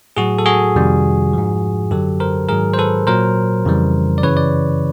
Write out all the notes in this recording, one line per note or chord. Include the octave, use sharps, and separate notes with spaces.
A2 F#3 F#4 G#4
A4
F#4 G#4
F2 C3 D#3 G3
G#2 F3
F#2 D3 F#3 G4 A4
A#4 C5
G#2 D#3 F#3 G#4 A#4
C5
A4 B4
A#2 F#3 A#4 C5
F2 C#3 E3 G3
D5
F#2 C#3 E3 B4 C#5
D5